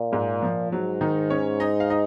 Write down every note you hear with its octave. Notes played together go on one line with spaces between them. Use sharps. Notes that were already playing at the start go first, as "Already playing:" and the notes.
Already playing: A#2
G#2 G#3
F3
G#2 F#3
D#3 D#4
C#4 C#5
D#4 D#5
F5
D#4 D#5